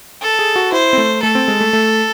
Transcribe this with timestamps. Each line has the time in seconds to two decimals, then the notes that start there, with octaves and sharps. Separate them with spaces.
0.22 A4
0.39 G#4
0.56 F#4
0.72 E4 C5
0.93 C4
0.98 A3
1.22 A3 A4
1.35 C4
1.48 G#3
1.61 A3
1.73 A3